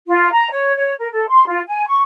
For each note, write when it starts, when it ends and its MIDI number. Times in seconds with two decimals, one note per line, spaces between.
0.07 0.31 65
0.32 0.47 82
0.50 0.75 73
0.75 0.92 73
0.98 1.07 70
1.11 1.25 69
1.27 1.43 84
1.47 1.59 65
1.66 1.86 80
1.86 2.01 85